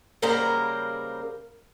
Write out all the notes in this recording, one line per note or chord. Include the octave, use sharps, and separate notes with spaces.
C#3 G3 A#3 A#4 C5 F#5